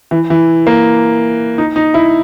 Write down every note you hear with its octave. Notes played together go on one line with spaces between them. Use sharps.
E3
E3
A#3
D#4
D#4
E4